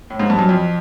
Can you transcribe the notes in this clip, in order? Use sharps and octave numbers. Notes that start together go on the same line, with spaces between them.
A2
G#2
G2
F#2
F2